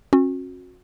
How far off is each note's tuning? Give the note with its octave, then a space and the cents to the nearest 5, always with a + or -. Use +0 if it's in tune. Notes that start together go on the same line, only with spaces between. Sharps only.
C#4 -40 F#4 -30